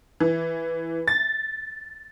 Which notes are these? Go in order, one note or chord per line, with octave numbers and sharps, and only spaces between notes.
E3
A6